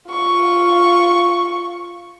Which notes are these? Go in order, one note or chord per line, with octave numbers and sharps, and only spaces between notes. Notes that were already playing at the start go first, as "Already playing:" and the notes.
F4 C#6